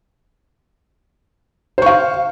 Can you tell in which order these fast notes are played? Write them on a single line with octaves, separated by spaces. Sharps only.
C5 C#6 F5